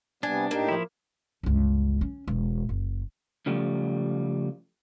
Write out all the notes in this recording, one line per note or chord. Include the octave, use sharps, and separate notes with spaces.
C3 G3 B3 D4 G#5
A2 A#3 D#4 G4
F3 E4
G1 C#2
C#4
E1
F#1
C#3 F3 G3 A3